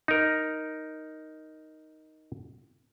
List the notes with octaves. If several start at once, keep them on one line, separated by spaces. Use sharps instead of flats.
D#4 A#4